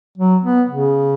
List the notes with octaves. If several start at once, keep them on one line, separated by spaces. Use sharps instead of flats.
F#3
B3
C#3